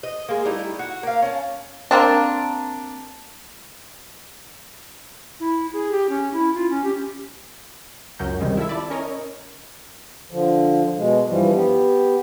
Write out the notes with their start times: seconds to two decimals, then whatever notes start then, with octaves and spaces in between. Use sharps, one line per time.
0.03 D#5
0.29 G#3 A#3
0.45 G3 A3 D#4 E4
0.79 F#4
1.03 A#3 F5
1.22 C#4 A5
1.91 A#3 C4 D4
5.40 E4
5.73 G#4
5.91 G4
6.09 C#4
6.33 E4
6.54 F4
6.70 C#4
6.84 G4
8.19 C#2 F#2 F#3 C#4 A#4 G6
8.40 C#2 C3 D#3 G3 G#3
8.57 E4 F4 A4 E5
8.69 D5 E5 A5 B5
8.90 C#4 A#4 C#5 D#5
10.31 D3 F3
10.97 B2 G#3
11.28 G2 E3 F3 G3
11.53 B3 G4